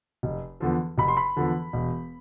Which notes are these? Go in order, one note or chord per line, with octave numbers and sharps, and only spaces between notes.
F1
E2 D3 F3
F1 B5
C6
B5
E2 D3 F3
E1